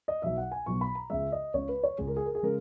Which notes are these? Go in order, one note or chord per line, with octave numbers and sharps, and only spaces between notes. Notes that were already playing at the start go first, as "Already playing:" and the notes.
D#5
B1 B2 F#3 E5
F#5
G#5
B1 B2 F#3 C#6
B5
A#5
C#2 C#3 G#3 E5
D#5
C#2 C#3 G#3 C#5
B4
C#5
C#2 C#3 G#3 G#4
A#4
G#4
A#4
G#4
C#3 G#3 A#4